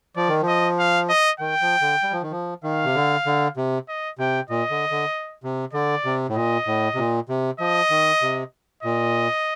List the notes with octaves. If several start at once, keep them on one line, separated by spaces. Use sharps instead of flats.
F3 D5
D#3
F3
D#5
F5
D#5
D#3 G5
F3
D3
G3
F3
D#3
F3
D#3 F5
C3
D3
D3
C3
D#5
C3 G5
A#2 D#5
D3
D3
C3
D3 D5
C3
A2
A#2 D#5
A2
C3
A#2
C3
F3 D#5
D#3
C3
A#2 D#5